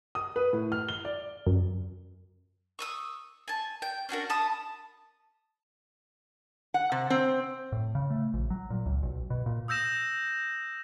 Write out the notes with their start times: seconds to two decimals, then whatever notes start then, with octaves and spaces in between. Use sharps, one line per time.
0.15 D#6
0.36 B4
0.53 A2
0.72 F6
0.89 G7
1.05 D5
1.47 F#2
2.79 C#6 D#6 E6
3.48 G#5 A5
3.82 G5
4.09 C#4 D4 F#4 A#4
4.30 A5 B5 D#6
6.74 F#5
6.92 C3
7.10 C4
7.72 A2
7.95 C#3
8.10 A3
8.34 A#1
8.50 F#3
8.70 A#2
8.86 C#2
9.03 B1
9.30 B2
9.46 A#2
9.68 D#6 E6 G6 A#6 E7